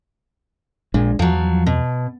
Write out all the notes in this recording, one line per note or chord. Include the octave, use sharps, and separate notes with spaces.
A#1 A#2 G#3 D4
E2 F3 F#3
B2